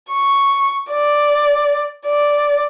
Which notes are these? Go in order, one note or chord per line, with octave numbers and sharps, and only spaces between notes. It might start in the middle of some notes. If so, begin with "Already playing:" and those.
C#6
D5
D5